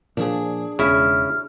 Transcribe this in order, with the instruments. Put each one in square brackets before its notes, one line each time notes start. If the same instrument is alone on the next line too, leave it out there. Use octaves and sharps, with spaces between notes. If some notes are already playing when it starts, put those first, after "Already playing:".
[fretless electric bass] A#2 F3 [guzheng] D4 G#4
[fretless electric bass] E1 [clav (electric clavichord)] C#3 E4 [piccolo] F6